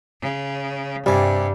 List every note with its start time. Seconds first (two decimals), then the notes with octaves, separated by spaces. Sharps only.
0.22 C#3
1.06 G2 C3 G3 G#5